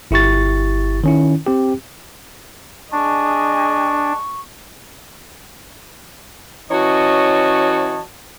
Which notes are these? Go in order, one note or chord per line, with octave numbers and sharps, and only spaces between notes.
G1 E4 G4 C#6 A6
D#3 C#4 E4
C4 G4
D4 G#4 D#5 C#6
E3 C#4 F#4 C#5 D#5 A5